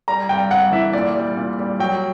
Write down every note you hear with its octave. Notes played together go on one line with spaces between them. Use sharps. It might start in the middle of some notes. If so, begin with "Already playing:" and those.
G3 A#5
G2 G5
G2 F#5
E3 E5
A#2 D5
G3
A#2
G3
F#3 G5